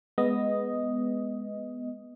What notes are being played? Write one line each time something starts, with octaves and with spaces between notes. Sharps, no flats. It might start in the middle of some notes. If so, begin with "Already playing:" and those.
G#3 B3 D#5